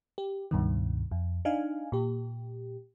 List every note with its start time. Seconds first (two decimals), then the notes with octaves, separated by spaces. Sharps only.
0.18 G4
0.51 C#2 G2 B2 D#3
1.11 F2
1.45 D4 D#4 F5 G#5
1.92 A#2 G4